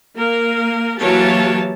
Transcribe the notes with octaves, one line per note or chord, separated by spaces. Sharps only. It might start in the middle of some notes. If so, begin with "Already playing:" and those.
A#3 A#4
E3 F#3 A#3 G4 C#5 A5